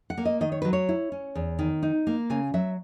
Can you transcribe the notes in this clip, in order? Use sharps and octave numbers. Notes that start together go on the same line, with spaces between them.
F#5
A#3
D#5
D#3 D#5
C#5
F#3 B4
C#5
E4
C#4
E2
D#3
D#4
A#3
C#3 G#5
F#3 E5